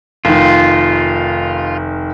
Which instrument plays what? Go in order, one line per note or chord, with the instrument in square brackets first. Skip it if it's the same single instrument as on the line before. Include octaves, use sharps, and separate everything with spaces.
[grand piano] F1 D#3 [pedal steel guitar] F4